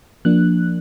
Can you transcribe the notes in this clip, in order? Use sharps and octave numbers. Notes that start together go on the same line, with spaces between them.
F3 A#3 D4 F#6